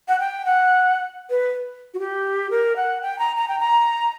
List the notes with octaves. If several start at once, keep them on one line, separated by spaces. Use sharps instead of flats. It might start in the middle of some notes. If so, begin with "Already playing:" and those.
F#5
G5
F#5
B4
F#4
G4
A#4
F#5
G5
A#5
A#5
G5
A#5